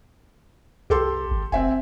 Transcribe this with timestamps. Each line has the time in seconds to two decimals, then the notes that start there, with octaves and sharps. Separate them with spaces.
0.90 C2 G4 A4 C6
1.31 G#1
1.52 F1 C4 E5 G#5